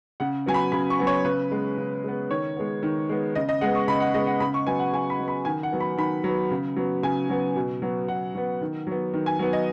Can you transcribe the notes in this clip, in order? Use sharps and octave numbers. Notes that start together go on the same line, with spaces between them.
C#3 F#5
F#3 B3 G#5
B5
C#3 B5
C#6
F#3 B3
C#5
C#3 B4
G#3 B3
C#3
G#3 B3
D#3 C#5
G#3 B3
D#3
G#3 B3
C#3 D#5
D#5
G#3 B3 F#5
C#6
C#3 B5
F#5
G#3 B3 D#5
F#5
C#3 B5
C#6
F#3 B3 G#5
F#5
C#3 G#5
B5
F#3 B3
B5
D#3 G#5
F#5
F#3 B3
B5
D#3 B5
F#3 B3
C#3
F#3 B3
C#3 G#5
F#3 B3
B2
F#3 B3
B2 F#5
F#3 B3
D#3
F#3 B3
D#3
G#5
F#3 B3
D#5